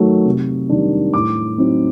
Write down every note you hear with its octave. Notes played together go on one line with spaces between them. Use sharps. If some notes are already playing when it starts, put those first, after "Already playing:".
Already playing: D#3 F#3 A3
C3
D#3 G3 D4
A2 D6
F#3 C4 D#4